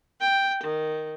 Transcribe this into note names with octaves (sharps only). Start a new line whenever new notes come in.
G5
D#3